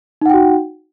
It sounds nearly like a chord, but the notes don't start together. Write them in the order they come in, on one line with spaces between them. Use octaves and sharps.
D#4 F#5 G5 F#4